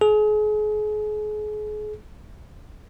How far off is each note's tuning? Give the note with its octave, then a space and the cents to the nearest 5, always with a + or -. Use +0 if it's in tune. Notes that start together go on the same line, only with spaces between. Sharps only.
G#4 +35